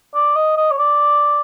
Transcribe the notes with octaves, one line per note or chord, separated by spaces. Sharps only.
D5
D#5
D#5
C#5
D5